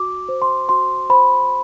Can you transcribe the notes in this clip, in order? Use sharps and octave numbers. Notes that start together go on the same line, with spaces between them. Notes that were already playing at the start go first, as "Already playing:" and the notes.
Already playing: F#4 D6
C5
C6
F#4 C6
C5 B5